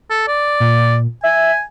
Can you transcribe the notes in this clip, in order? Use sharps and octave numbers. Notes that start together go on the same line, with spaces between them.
A4
D5
A#2
E5 G#5